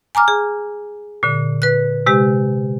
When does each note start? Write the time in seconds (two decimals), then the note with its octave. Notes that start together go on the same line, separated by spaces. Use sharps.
0.15 G#5 A#5 D6 F6
0.28 G#4
1.23 A#2 D3
1.62 B4 F#6
2.06 C3 G#3 G4